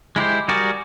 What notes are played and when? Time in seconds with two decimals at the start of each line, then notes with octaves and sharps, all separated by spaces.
0.16 G#3 E4 G4 C5
0.48 G3 F#4 G#4 A#4 D5